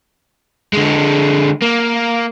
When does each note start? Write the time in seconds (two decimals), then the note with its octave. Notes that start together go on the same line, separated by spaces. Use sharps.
0.73 D3 G#3
1.62 A#3